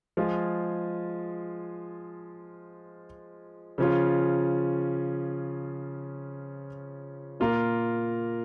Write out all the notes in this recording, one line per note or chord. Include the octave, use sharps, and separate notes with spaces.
F3 G#3 F4 G#4
C#3 F3 C#4 F4
A#2 A#3 F4 A#4